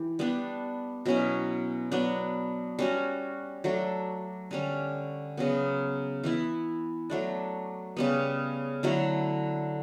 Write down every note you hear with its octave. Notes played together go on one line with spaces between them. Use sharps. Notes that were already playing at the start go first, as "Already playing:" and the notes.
Already playing: E3 G4
G3 B3 D4
B2 F#3 C#4 E4
F#3 B3 D4
G3 C#4 F#4
F#3 A3 D4 A4
D3 G3 C#4
C#3 F#3 B3
E3 B3 E4
F#3 A3 D4
C#3 G3 B3
D3 F#3 A3 E4